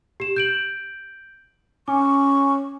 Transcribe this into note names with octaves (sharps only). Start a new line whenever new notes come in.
G4 E7
G6 D7 F#7
C#4 C#6 D6